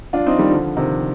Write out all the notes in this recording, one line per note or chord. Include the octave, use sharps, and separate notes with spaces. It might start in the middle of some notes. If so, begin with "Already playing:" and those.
D4 F4
C4 D#4
D#3 G3
D3 F3
C3 D#3